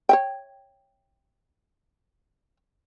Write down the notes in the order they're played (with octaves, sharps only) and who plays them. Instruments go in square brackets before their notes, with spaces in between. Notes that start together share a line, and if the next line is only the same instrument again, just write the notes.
[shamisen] C#5 E5 G5